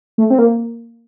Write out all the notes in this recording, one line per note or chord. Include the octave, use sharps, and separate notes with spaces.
A3
C4
A#3